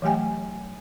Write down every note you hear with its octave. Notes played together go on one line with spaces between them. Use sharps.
E3 F#3 A3 G4 G5 G#5